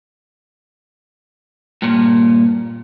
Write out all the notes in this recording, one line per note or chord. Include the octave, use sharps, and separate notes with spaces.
G2 A#2